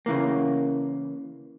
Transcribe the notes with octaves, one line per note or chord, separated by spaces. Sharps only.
C#3 E3 A#3